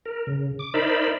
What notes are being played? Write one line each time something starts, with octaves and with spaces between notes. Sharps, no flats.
A#4
C#3
D6
D#4 A#4 C5 D5 E5 B5